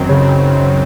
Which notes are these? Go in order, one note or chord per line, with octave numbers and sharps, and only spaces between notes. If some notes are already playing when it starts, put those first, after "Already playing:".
Already playing: F#2 D#3 F#3 C4
C#3